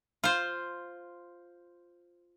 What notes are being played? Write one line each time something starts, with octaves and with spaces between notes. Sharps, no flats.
F4 C5